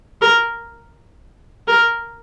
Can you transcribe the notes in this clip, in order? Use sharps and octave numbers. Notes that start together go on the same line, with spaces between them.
A#4
A#4